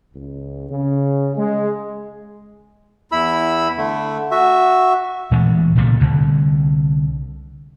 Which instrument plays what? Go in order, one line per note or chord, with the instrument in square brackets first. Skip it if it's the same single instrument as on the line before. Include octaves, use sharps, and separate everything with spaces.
[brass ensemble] C#2
C#3
G#3
[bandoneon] E2 E4 B5 E6
D3 A3
F#4 E5
[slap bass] A#2 E3 G#3 A3
C2 A#2 C#3 A3
C2 D3